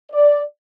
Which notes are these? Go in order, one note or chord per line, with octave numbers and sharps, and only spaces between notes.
D5